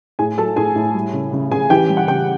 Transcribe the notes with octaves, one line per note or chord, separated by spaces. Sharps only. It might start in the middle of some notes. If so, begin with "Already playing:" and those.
A2 G#4 G#5
F#3 A4 A5
A2 G#4 G#5
A2
G3
C#3
C#3
C#3 G#4 G#5
E3 G4 G5
G3
F#5
C#3 G4 G5